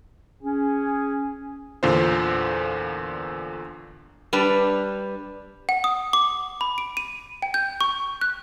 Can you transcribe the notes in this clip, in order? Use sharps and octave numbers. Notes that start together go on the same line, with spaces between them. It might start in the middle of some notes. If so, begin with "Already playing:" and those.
C#4 G#4
E2 A#2 D3 F4 C5
G3 D4 B4
F#5
D#6
D6
B5
D7
D#7
G5
G6
C#6
F#6